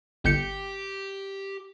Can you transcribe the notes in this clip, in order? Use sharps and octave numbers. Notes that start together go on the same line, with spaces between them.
G1 G4 G6 C#7